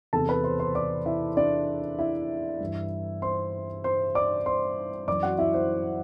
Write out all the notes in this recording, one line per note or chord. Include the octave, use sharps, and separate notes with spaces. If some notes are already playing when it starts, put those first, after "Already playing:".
E2 C3 E3 A4 A5
B4 B5
C5 C6
C5 C6
D5 D6
E4 E5
D4 D5
E4 E5
G2 E3
C5 C6
C5 C6
D5 D6
C5 C6
F#2 E3 D5 D6
F#4 F#5
E4 E5
C5